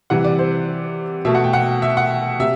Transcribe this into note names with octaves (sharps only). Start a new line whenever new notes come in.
C3 E3 G3 F#5
D5
C5
B2 A3 E5
F#5
G5
F#5
E5
F#5
C3 E5